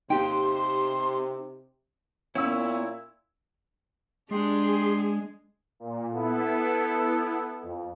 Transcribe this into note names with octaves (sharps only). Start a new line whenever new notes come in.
C3 D#4 G4 G5 C6
A#2 B3 C#4 E4 F5 G5 E6
G#3 D4 G4 G#4 C6
A#2
B3 E4 A4
F2